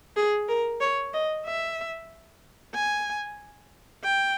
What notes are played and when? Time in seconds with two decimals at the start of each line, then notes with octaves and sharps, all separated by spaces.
0.16 G#4
0.49 A#4
0.81 C#5
1.13 D#5
1.46 E5
2.74 G#5
4.04 G5